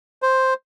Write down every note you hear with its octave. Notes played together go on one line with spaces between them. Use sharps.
C5